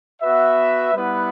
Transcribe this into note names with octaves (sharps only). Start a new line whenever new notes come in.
B3 F#4 B4 E5
G3 B3 E4 B4 F#5